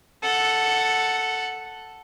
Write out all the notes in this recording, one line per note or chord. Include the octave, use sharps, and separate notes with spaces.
A4 F#5